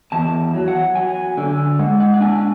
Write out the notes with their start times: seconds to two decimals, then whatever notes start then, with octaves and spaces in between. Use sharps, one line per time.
0.12 E2 A5
0.54 F#3
0.68 F#5
0.95 F#3 G#5
1.37 D3
1.79 G#3 F#5
2.00 F#5
2.14 F#5
2.21 D4 G#5